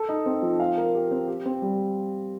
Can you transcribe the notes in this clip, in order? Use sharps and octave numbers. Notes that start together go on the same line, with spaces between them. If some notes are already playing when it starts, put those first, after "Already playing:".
Already playing: A4
D#4
C4
F3
F5
A#4
G4
C4
G4
C4
G3